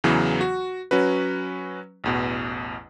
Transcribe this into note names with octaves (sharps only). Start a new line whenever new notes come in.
E2 C#3 E3 F#3 B3
F#4
F#3 C#4 F#4 B4
A1 E2 B2